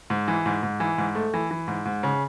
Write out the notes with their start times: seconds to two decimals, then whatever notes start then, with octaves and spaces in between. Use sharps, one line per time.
0.10 G#2
0.28 E3
0.46 G#2
0.63 G#2
0.80 E3
0.98 G#2
1.15 A3
1.34 E3
1.51 E3
1.68 G#2
1.85 G#2
2.03 C#3